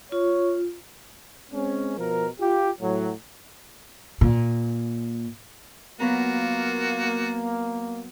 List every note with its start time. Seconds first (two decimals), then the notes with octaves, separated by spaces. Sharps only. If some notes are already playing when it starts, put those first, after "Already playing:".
0.12 F4 C#5
1.52 G#3 C4 C#4
1.98 B2 F3 A#4
2.40 F4 G4
2.81 A2 F#3
4.21 A#2
6.00 F#3 A#3 B3 F4 F#4 A#5